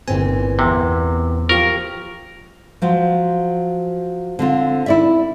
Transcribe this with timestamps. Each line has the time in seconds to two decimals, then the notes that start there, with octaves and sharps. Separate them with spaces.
0.08 G1 A#2 E3 C4 G#5
0.59 E2 C3 B3
1.49 F3 F4 G4 A#4 C#6
2.82 F3 F#3
4.39 D3 C4 F4
4.86 E4 D5 E5